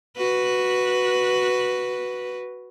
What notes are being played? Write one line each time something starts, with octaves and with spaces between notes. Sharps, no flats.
F#4 B4